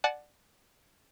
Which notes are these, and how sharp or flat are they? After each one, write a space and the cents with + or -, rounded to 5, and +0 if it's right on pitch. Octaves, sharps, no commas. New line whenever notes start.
D5 +15 F#5 +0 A5 -35